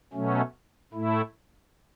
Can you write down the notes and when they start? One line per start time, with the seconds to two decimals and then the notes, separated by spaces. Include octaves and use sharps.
0.13 B2 F#3 A3 C#4
0.93 A2 A3 E4